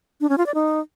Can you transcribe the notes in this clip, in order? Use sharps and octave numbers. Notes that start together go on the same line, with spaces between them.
D4
C#4
F4
D5
D#4